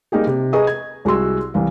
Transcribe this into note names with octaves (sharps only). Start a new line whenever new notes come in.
G3 A#3 D#4 G4 G#4
C3
G#4 B4 D#5 A#5 C#6 D#6
G#6
C2 G#3 F#4 F#5 C6 E6
C2 E3 F5